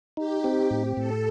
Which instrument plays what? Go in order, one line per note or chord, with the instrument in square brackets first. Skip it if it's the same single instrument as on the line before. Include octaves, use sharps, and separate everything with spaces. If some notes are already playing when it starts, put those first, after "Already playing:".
[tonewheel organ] D#4 [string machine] G4
[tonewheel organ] C4
A2
[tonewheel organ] A2 [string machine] A4